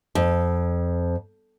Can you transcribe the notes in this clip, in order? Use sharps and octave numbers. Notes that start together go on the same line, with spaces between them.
F2